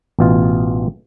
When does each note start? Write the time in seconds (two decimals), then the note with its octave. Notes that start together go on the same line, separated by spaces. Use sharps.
0.19 A1 B2 F4